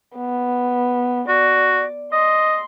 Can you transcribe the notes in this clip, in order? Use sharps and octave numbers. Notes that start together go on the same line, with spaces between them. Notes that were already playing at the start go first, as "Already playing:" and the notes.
B3
F#4 D5
D#5 C6